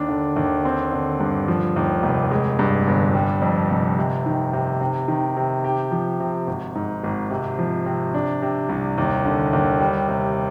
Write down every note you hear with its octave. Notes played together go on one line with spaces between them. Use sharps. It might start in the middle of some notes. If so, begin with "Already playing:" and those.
Already playing: D#2 D4
D3
D#2
C4
D3
G2
F3
D#2
F1
G#3
G2
G1
G3
F2
F1
C3
D#3
C3
C3
D#3
C3
G4
F3
C3
G#1
G#2
G#1
C3
F3
C3
D4
C3
C2
D#2
D3
D#2
G3
C3